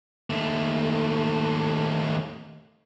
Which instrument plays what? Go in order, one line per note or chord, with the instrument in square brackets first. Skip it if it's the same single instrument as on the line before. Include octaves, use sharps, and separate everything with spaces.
[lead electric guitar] D#2 A3